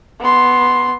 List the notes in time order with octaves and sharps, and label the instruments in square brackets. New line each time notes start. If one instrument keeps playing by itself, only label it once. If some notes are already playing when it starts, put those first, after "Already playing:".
[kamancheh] B3 C6